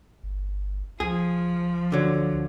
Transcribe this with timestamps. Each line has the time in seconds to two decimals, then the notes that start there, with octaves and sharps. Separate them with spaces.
0.23 G1
1.00 C#2 F3 G#4
1.92 D3 F#3